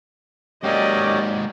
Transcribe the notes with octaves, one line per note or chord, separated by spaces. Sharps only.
G#2 F#3 A#3 C#4 G4 D5 D#5